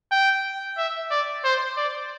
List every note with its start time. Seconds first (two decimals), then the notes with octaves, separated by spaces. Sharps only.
0.11 G5
0.78 E5
1.11 D5
1.45 C5
1.77 D5